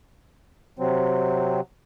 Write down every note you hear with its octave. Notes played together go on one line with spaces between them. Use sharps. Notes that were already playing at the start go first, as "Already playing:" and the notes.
C3 F#3 C4